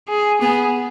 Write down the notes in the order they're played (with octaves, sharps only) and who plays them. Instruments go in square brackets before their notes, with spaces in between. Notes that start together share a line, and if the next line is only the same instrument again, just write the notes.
[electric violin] G#4
[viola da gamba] B3 [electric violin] G#4